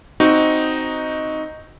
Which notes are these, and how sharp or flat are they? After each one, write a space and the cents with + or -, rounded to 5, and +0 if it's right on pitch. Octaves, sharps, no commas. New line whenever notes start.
C4 +0 D#4 +0 F#4 +0